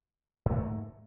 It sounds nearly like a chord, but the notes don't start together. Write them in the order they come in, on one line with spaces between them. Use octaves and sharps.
G#2 A3 A#3